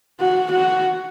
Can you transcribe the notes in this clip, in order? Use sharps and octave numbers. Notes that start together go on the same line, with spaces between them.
F#4
F#4